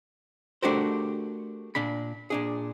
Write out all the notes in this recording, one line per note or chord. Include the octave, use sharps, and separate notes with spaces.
A3 D4 F#4 G4 A#4 C5
A#2 D4 B5
A#2 D4 G#4